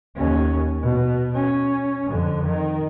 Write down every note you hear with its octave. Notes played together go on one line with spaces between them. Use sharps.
D#2 C#4
B2
C#4
F2 D3
D#3